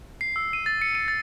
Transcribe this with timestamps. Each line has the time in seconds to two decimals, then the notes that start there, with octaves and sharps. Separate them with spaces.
0.21 C7
0.36 E6
0.53 D#7
0.66 A6
0.82 C#7
0.95 D#7
1.08 A6